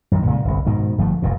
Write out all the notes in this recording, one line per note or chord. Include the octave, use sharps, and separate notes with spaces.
F#2 D#3
A#2 C#3 F3 G#3
G1 C2
G#2 B2 D#3
G1 F3 A3
F1 G2 A#2